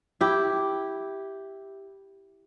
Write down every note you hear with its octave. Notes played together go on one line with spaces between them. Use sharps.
E4 G4